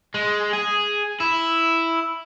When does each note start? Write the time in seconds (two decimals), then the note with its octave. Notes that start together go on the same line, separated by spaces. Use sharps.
0.14 G#3
0.53 G#4
1.20 E4